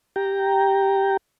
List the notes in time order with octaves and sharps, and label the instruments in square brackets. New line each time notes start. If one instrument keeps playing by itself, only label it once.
[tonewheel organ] G4 G5 A#5